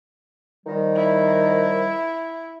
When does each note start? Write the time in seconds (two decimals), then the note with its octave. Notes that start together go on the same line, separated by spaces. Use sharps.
0.66 D#3 F3 G3
0.96 E4